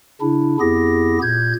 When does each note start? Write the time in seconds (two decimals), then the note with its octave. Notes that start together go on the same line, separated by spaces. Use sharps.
0.21 C#3 D4 E4
0.60 F2 B3 E4 G4 G#4 A#6
1.22 A#2 G6 G#6